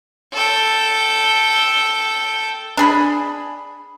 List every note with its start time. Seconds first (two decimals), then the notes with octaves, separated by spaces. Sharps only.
0.33 A4 G5
2.77 D4 G#4 B5